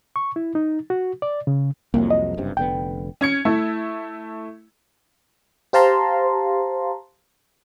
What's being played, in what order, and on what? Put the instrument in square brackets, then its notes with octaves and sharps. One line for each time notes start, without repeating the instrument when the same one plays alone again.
[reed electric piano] C#6
E4
D#4
F#4
D5
C#3
[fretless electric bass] C2 F2 F#3 [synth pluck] A#3
[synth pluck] D#5
[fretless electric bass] F#1 G2 C3
[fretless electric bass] F1 D3 B3 [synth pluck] G5
[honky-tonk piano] C#4 G#6 C#7
A3 E4
[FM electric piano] G4 C5 F5 A5 A#5 C6